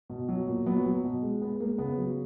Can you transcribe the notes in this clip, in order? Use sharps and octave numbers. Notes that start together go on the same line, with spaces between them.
B2
F#3
A#2
F#3 B3
F#3
B2
G#3
G#3 B3
G#3 A#3
C#3 B3
F#3